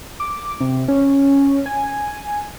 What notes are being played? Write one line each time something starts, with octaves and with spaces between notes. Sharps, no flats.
D6
C3
C#4
G#5